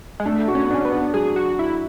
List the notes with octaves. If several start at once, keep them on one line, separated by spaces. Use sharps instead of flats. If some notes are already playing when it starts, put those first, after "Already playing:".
G#3
A3 D4
F#4
C#4
B3
C#4 D4
B3
D4
F#3 G#4
F#4
E4